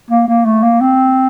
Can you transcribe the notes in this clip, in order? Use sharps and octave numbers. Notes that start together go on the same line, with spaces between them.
A#3
A#3
A3
A#3
C4